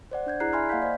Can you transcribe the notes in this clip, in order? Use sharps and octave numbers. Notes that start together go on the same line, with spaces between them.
C5 D5 F#5
D4 G6 G#6
E4 G#4 D5 A#5 F#6 C7
E5 G#5 B5 C6 F6 G#6
A#3 D#5 F5 F#5 G6 B6
C5 D5